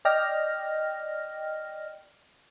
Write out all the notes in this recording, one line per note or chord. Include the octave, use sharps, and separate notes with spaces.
D5 D#5 G5 F6 A#6